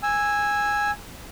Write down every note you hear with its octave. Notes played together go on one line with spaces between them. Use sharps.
G#5 E6